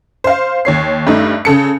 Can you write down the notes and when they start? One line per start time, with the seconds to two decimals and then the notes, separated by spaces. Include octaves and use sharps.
0.24 C5 F5
0.65 D#2 C#5 C7
1.07 G2 A3 D#4
1.45 C#3 A4 C#7